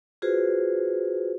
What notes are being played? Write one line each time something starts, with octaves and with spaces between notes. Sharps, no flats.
F4 F#4 G#4 B4 C5